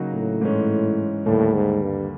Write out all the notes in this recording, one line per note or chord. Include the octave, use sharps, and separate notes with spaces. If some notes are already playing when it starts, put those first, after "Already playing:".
Already playing: C#3 F#3 A#3 D#4 F#4
A2
G#2 E3 G#3 C#4
D#2 A2 D3 G3 A#3
G#2
G2